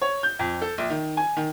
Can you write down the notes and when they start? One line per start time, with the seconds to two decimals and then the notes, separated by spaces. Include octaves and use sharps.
0.01 C#5
0.23 G6
0.39 F2
0.62 A4
0.78 A#1
0.90 D#3
1.17 G#5
1.37 D#3